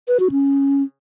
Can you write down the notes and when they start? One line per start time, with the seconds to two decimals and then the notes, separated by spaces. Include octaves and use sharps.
0.08 B4
0.20 F#4
0.31 C#4